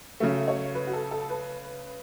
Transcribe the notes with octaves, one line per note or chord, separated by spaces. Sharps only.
C#3 F#3 A3 E5
C#5
B4
F#4
A4
A4
B4